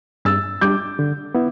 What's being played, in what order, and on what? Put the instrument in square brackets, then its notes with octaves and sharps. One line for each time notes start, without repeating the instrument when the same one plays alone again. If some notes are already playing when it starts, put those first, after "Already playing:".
[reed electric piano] G2 [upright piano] E6 A6
[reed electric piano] G3 D4 [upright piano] D6 G6
[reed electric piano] D3
B3 E4